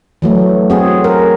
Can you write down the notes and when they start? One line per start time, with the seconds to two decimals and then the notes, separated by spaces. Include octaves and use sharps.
0.22 E3 F#3 A3
0.70 C4 F#4 G#4
1.04 A#4